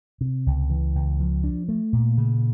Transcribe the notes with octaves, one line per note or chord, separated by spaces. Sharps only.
C3
C#2
E3
C#2
F3
D4
A3
A#2
C#3